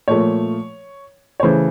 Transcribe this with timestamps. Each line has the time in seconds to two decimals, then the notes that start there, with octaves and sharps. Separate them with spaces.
0.08 A#2 F3 A3 C#5
1.40 C#5
1.43 C#3 E3 A3 C5